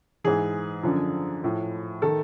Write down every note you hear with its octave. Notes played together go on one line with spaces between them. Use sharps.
G#2 E3 G#4
F#2 D3 F3
A2 F3
D#3 A4